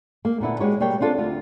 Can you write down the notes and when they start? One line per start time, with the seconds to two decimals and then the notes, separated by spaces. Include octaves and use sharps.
0.25 A#3
0.40 A#2 D3 B3 E4
0.60 G#3 F#4 G4 B4 C#5
0.80 B2 G3 A#3 C#5 G5
1.01 C4 D4 F4 A4
1.18 D2 F4